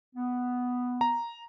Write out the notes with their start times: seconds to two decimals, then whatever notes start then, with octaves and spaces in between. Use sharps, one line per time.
0.15 B3
1.01 A#5